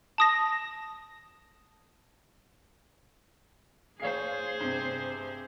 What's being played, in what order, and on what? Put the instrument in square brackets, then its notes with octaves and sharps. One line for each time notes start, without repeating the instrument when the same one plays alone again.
[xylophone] A5 D#6 A#6
[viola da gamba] G#4 C5 [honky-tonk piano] C#5 F5 C7
[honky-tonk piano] G2 C3